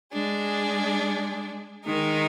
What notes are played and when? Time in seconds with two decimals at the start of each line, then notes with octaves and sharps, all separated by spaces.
0.13 G#3 D4 G#4
1.85 D#3 G#3 D#4 A#4